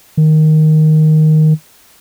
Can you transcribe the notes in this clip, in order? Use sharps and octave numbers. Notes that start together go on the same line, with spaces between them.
D#3